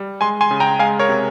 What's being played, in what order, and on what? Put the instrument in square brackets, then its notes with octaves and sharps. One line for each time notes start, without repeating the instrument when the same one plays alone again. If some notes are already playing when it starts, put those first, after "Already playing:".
Already playing: [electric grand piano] G3
G#3 G#5 C6
G#5 C6
C#3
G5 A#5
G#3 F5 G#5
A#4 C#5
C3